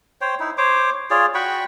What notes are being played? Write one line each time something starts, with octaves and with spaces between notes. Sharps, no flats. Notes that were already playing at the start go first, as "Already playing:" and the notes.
C5 C#5 G5
D#4 E4
C5 C#5 D6
F4 G#4 C#5 D5
F#4 G5 B5 C#6